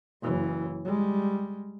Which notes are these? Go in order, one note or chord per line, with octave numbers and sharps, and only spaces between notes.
F#1 E3
G3 G#3